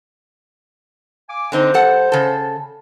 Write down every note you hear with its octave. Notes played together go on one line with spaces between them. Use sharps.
F5 G#5 D6
D3 C4 D#4 C5
G2 A4 F#5
C#3 A4